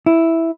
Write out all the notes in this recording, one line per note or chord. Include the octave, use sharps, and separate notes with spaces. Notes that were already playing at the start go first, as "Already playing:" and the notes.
E4